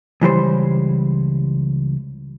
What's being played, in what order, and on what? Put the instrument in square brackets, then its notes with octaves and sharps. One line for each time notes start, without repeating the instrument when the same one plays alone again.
[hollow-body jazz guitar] C#2 E3 G3 C5